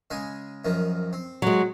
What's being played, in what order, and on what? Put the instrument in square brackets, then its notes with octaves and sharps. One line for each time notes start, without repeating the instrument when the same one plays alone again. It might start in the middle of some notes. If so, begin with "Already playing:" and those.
[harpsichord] C#3 G#3 G#5
F#2 D#3 F3
C4
[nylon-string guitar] F#3 G#3